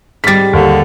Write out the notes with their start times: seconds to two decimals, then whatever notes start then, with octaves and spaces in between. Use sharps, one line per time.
0.24 G#2 G3 A6 B6
0.53 D#2 D3